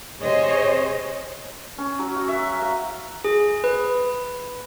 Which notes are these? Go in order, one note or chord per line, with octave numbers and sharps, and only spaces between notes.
C3 G#4 C5 C#5 D#5
C#4
F#3
F#4
E5
F5
G#4
B4